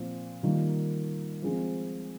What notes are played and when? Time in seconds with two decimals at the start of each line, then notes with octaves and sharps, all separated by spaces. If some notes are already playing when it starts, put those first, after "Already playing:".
Already playing: A#2 F3 C4
0.43 D#3 G3 A#3 F4
1.42 F3 G#3 C4